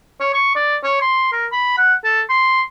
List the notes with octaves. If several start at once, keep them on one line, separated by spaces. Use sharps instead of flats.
C#5
C#6
D5
C#5
C6
A#4
B5
F#5
A4
C6